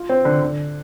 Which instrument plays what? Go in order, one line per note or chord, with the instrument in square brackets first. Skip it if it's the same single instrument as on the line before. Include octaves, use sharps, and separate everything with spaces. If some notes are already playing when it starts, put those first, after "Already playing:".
Already playing: [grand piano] F4
C4
D3
D3